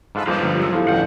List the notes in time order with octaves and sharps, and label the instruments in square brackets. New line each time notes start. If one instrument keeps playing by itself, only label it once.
[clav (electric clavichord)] G#2 F4 A4 [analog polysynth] B4
[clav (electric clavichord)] F2 A#3 D#4 [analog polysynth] F3 G3 [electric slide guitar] F4 B4 C5
[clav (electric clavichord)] G1
[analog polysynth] G#2 F#3 [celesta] G4 E6
[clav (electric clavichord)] E3 F3 [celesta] E4 A4 F5
[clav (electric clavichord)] A1 D2 [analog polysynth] E3 F3 [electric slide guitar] F#5 [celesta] G6